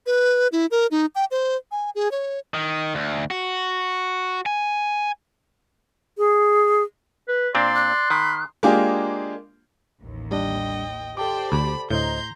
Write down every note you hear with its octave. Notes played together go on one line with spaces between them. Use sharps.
B4
E4
A#4
D#4
G5
C5
G#5
G#4
C#5
D#3
D2
F#4
G#5
G#4
B4
A#2 C4 D4 D5 C6
F#6
D#3 B5
G#3 A#3 D4 F4 G4 G#4
A1 D#2
G3 D4 D#5 G5
G4 A4 C5 D5 G5 A5 D6
D2 B5
D2 A2 C5 D#5 A#5 C6 G6